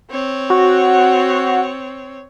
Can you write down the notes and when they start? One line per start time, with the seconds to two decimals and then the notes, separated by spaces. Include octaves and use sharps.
0.10 C4 C#5
0.50 F#4